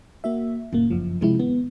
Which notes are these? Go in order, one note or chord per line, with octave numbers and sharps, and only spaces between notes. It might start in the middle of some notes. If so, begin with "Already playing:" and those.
A#3 F#4 E5
F#1 A#2 A#3
G1 F#2 F3
C3 F3 G#3 C4 E4
G#1 B3